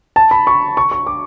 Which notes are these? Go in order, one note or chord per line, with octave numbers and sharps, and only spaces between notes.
A5
B5
C#6
C#6
C#6
D6